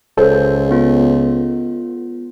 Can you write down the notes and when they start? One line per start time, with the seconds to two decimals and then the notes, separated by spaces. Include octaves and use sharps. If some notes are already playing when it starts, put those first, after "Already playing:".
0.17 C#2 A4 C5
0.71 B3 F4